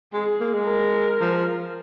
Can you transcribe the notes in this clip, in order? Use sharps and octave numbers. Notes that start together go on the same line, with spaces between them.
G#3 G#4
A#3
G#3
A#4
F3